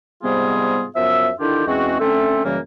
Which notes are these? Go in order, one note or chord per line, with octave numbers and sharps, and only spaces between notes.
G#2 C3 G3 B3 F4 G#4
F#2 F3 B3 E5
D3 D#3 D4 E4 F4 G4
E2 G#3 C4 C#4 F#4
D3 A3 C4 C#4 C5 E5
F#2 C#3 E3 G3 A#3